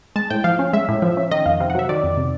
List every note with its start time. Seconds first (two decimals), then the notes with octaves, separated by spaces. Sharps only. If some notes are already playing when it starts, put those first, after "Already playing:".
0.16 G#3 A5
0.30 A2 G5
0.44 F3 F5
0.59 C#4
0.73 G#3 E5
0.88 A2
1.02 F3
1.17 C#4
1.31 D#3 D#5
1.46 F2 F5
1.60 C3 F5
1.70 F#5
1.75 F#3 E5
1.89 D#3 D5
2.04 F2
2.17 C3